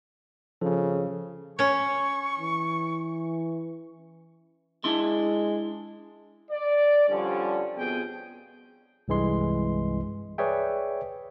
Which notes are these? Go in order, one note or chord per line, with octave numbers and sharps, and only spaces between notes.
C#3 F3 A4
C#4 C#5 C#6
E3
G#3 D4 E4 C6
D5
D3 F3 G3 C#4
F2 B2 B3 G#4 G5
C2 G2 E3 G#3 C6
G#4 B4 C#5 D5 E5 G5